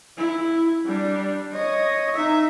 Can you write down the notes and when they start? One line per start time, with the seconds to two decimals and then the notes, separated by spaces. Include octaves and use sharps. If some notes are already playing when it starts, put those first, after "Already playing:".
0.17 E4
0.85 G3 D4
1.53 C#5 D#5
2.15 D#4 E5